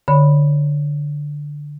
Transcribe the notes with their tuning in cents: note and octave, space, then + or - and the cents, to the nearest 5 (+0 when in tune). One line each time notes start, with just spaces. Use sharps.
D3 +0 C#5 +0 B5 +0